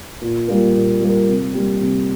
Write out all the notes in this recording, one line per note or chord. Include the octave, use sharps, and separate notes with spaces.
A#2
G3 A#3 F4 A#4
A#2
G3 A#3 F4 A#4
C3
G3 A#3 G4
C3